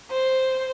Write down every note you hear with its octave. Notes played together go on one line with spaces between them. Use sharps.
C5